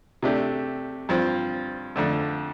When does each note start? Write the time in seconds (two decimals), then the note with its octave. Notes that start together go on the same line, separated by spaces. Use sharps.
0.23 C3 A3 D4 G4
1.09 G2 F3 C4
1.96 F2 D3 A3